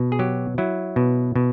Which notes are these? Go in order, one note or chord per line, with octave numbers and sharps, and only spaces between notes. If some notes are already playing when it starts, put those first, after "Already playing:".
Already playing: B2
G#4
F#3 G4
F#3 E4
B2
B2